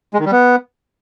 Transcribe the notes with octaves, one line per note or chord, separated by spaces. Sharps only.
G#3
D#3
G3
B3